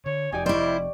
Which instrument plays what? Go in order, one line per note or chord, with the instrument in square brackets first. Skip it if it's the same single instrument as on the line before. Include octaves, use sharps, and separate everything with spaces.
[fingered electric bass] D3 [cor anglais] C#5
[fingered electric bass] F1 F2 [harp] D#4 G4 D5 [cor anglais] G#5
[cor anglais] G3 [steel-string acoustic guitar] E4 C5 [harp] D5 C#6